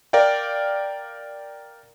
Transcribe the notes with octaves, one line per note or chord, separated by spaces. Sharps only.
A#4 D5 F5 G5